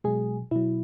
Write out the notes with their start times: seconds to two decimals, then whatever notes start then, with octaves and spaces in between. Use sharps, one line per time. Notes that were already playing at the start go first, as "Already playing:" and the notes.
0.04 B2 F#3 G#3 G#4
0.51 B2 F#3 E4